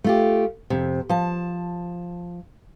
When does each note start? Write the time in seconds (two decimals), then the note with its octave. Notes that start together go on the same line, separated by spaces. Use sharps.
0.04 A3 F4 G4
0.70 F2 C3
1.09 F3 A5